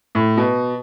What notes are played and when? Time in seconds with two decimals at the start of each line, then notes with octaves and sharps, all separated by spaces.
0.15 A2
0.37 B2